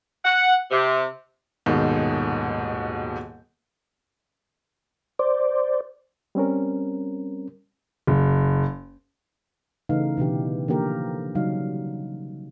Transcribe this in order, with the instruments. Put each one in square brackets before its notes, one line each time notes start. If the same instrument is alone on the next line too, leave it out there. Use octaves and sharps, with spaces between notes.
[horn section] F#5
C3
[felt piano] D#1 G#2 B2 D#3
[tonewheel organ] C5 D5
[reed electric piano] G3 C4 C#4 A#4
[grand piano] F#1
[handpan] C#3 E3 A3 D#4 F5
B2 D3 E3 G4
D3 E3 F3 A#3 G4 A#4
C#3 F#3 G3 D#4 F5